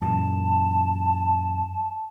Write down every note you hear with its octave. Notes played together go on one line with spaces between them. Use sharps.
F#2 A#2 E3 A5